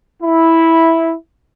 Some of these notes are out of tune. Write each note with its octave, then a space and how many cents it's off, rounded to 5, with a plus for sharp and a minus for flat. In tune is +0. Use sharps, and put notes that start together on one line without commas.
E4 -5